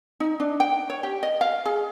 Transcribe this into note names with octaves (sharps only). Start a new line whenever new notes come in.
D#4
D4
G5
C#5
G4
D#5
F5
G#4